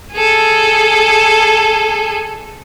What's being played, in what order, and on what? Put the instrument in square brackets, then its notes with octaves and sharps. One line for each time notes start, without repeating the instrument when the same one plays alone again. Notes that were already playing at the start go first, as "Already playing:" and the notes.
[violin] G#4 A4